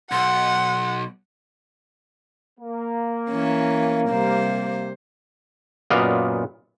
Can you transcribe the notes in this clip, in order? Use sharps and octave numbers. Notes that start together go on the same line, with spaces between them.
B1 F#5 C6
A#3
E3 C#4
C3 G3 C5
F#2 A#2 B3 D5 D#5 F5